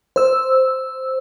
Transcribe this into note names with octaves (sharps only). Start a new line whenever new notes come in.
C5 E6